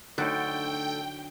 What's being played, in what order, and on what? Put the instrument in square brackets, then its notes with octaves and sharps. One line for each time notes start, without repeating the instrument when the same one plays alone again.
[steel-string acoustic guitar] D2 A4 [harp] D3 D#4 F#6 [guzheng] F#3 [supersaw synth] G5